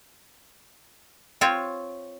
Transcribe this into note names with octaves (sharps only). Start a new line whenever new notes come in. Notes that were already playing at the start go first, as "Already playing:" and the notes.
C4 F4 C#5